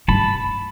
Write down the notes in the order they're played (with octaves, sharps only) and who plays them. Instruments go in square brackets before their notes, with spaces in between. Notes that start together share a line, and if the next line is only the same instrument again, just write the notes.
[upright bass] G2 [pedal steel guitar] A5 B5